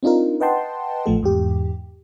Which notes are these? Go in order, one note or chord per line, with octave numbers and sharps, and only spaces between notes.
C4 D4 D#4 F4 A#4
B4 D#5 F#5 G5 A5 C6
A1 F3 A3 A4
E2 G#2 G4